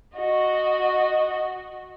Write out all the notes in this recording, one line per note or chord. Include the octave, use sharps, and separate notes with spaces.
F#4 D#5